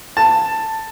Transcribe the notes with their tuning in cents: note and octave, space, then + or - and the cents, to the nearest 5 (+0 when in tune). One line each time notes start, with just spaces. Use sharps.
A5 +10